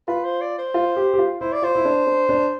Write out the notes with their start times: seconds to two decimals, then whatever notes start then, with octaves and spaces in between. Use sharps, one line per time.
0.08 F4 B4
0.24 C5
0.41 D5
0.58 C5
0.74 F4
0.96 G4
1.13 G4
1.19 F4
1.41 E4 C5
1.52 D5
1.62 F4 C5
1.75 E4
1.85 D4
2.07 D4
2.29 D4